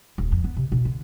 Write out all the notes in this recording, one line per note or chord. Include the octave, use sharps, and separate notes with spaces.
D#1
F2
B3
C3
B2
D3